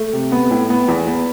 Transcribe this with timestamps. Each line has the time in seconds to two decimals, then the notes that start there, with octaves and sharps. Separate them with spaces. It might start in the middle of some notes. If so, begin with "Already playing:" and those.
Already playing: A3
0.13 C3
0.32 B3
0.51 A2
0.70 B3
0.88 E2
1.07 B3